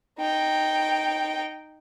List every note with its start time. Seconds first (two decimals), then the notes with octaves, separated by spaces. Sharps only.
0.19 D#4 G5